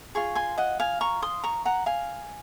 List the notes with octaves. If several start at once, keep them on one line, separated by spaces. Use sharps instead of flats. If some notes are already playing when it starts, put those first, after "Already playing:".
F4 G#4 C#6
G#5 C6
D#5 F#5
F5 G#5
A#5 C#6
C6 D#6
A#5 C#6
F#5 A#5
F5 G#5